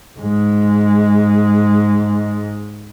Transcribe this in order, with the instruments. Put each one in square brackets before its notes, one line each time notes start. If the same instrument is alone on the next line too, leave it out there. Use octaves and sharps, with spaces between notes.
[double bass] G#2 G#3